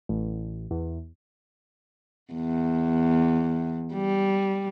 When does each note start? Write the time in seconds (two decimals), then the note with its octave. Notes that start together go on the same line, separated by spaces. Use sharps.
0.09 A1
0.71 E2
2.33 E2
3.94 G3